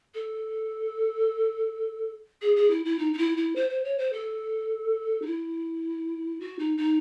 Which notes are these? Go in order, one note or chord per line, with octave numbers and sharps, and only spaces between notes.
A4
G#4
G#4
E4
E4
D#4
D#4
E4
E4
C5
C5
C#5
C5
A4
D#4
E4
F#4
D#4
D#4